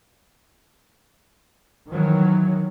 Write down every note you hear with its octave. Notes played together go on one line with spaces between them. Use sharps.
D#3 E3 F#3